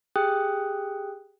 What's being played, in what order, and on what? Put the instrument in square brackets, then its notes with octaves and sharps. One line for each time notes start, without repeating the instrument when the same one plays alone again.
[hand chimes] G4 G#4 G5 D#6 F#6